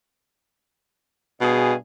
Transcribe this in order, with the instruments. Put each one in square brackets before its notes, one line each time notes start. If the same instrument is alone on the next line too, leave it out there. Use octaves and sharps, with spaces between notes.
[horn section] G2 G#4 [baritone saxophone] B2